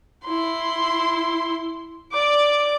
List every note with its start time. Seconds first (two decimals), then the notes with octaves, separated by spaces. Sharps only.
0.25 E4 C6
2.12 D5 D6